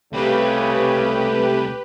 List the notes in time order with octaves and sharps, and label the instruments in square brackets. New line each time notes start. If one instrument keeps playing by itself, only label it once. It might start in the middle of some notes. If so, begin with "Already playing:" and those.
[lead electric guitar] C2 C4 [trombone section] C#3 [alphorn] A3 [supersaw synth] G4 B4